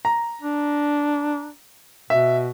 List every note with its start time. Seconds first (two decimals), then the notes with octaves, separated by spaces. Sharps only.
0.05 A#5
0.42 D4
2.10 B2 E5